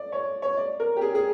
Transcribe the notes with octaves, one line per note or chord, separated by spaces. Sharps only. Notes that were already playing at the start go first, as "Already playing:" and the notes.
Already playing: D5
C#5
C#5
D5
A#4
G4
G#4
G#4